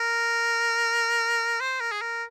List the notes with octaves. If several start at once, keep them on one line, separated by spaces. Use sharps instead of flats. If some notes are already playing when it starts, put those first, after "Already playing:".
Already playing: A#4
C5
A#4
G#4
A#4